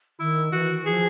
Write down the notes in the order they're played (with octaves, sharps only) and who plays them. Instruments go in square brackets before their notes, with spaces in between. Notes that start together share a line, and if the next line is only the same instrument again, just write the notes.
[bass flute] D#3 [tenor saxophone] E4
[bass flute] E3 [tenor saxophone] F#4
[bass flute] F3 [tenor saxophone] G#4